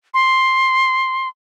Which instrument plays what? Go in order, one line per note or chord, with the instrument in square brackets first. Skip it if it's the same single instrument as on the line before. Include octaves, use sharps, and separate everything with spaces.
[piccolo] C6